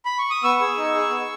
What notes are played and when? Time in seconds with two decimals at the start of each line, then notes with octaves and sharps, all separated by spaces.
0.05 B5
0.19 C#6
0.31 D#6
0.43 B3 C#6 E6
0.61 G#4
0.77 D#4
0.94 G#4
1.10 B3